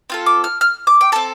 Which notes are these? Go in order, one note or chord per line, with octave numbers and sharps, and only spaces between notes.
C4 F4 A4
D6
F6
F6
D6
G5
C4 A4 A5